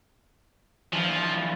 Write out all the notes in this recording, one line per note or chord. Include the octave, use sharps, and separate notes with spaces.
E3 F3 D4 F4